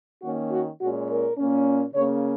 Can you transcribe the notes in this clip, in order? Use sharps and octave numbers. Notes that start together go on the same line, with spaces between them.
D#3 A#3 C#4 F#4
F#4
A#2 G#3 C#4 F#4
A#4
A#2 A#3 C#4
C#3 A#3 C#4 C#5